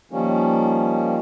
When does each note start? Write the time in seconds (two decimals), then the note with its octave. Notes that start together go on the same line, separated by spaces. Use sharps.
0.11 D#3 F3 G3 A#3 C#4